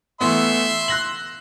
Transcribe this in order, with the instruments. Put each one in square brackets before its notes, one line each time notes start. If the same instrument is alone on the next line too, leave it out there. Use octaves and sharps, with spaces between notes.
[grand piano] E3 A3 B3 [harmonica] E5 C6
[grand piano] F#6 A#6 F#7